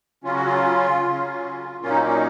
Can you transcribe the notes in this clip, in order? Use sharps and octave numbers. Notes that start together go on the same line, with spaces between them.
C#3 F#3 C#4 F4
F#4
F4
C#3 F#3 C#4
A#2 F#3 A#3 C#4 F4
D#4
D#4